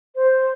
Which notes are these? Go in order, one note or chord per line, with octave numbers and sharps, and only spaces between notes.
C5